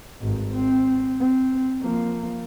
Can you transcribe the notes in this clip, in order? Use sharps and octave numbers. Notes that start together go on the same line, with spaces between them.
G#1 G2
C4
C4
F3 A#3